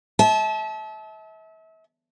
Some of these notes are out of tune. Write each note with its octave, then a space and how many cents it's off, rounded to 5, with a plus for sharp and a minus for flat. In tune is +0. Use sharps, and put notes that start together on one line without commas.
E5 -35 A5 -25